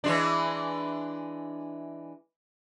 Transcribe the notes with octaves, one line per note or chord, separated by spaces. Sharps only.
E3 G#3 D4